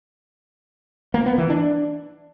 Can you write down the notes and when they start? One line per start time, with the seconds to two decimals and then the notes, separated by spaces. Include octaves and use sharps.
1.14 A#3
1.26 B3
1.38 E3
1.50 D4